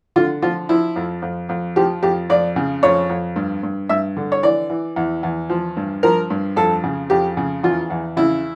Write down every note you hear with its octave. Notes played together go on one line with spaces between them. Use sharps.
D3 F4
F3 F4
F3 E4
F2
F2
F2
F3 G4
F2 G4
F2 D5
C#3
F2 C#5
F2
G2
G2
G2 E5
D3
C#5
E3 D5
E3
E2
E2
F3
G2
F3 A#4
G2
F2 A4
C#3
F2 G4
C#3
E2 F4
E2
C#3 E4